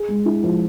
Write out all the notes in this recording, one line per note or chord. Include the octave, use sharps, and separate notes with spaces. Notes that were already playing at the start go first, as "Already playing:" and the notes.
Already playing: G#4
G#3
E4
F3